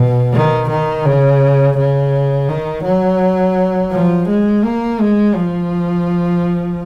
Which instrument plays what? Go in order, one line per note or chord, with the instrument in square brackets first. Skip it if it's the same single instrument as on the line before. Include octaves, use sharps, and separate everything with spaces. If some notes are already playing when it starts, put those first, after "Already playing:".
Already playing: [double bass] B2
D#3
D#3
C#3
C#3
D#3
F#3
F3
G#3
A#3
G#3
F3